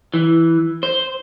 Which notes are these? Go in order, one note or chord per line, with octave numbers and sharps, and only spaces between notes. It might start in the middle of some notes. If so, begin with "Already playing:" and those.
E3
C5